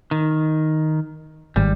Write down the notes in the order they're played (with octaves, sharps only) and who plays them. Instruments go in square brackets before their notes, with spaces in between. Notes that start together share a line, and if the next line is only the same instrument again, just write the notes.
[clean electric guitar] D#3
[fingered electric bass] G#1 [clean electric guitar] G3